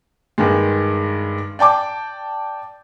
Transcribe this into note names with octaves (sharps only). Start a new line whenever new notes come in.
G2 D#3 G#3
D5 G5 A5 D6